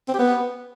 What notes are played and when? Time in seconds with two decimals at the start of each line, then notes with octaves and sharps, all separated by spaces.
0.08 C4
0.14 G4
0.19 B3